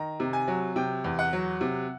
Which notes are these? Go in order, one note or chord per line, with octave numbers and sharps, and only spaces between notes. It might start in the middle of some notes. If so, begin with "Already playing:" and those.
Already playing: D#3 A#5
C3
G#5
F#3
C3 G5
E2
F#5
F#3
C3